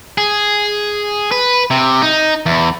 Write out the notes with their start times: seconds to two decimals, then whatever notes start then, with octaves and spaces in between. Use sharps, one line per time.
0.18 G#4
1.32 B4
1.70 C3
2.02 D#4
2.46 E2